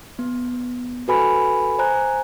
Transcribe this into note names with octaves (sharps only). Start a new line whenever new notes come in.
B3
F#4 A4 B4 G#5 B5
C5 G#5 A#5 F#6